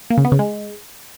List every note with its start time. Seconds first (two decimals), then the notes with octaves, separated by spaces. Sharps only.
0.10 A#3
0.18 C#3
0.25 B3
0.32 C#3
0.39 G#3